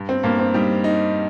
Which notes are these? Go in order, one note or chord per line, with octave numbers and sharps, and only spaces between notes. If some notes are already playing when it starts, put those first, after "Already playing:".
Already playing: G2
C4
G2 A#3
C4
G3 D#4
D#4